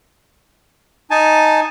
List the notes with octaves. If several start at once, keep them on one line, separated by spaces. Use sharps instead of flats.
D#4 G#5 A5